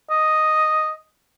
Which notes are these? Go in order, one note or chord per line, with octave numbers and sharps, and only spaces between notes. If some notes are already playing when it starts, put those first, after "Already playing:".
D#5